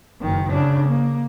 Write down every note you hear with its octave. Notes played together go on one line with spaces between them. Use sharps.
F#1 D#3
C#3 D4
A#3